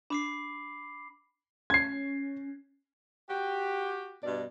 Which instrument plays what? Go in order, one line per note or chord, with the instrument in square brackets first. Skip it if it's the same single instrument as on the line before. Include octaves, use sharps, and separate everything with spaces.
[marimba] D4 [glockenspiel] B5 D6 C7
[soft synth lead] C#4 [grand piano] G#6 C7
[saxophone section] F#4 G4
G2 B2 D5